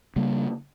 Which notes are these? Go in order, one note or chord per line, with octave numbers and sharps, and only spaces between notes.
C#3 G3 A#3